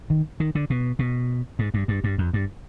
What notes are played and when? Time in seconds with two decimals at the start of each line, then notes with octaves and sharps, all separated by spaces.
0.10 D#3
0.40 D#3
0.55 D3
0.70 B2
0.99 B2
1.59 G#2
1.74 G2
1.88 G2
2.04 G2
2.18 F2
2.34 G2